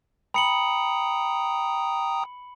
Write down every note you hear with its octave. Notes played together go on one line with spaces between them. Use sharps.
G5 A#5 B5 D#6 C#7 F#7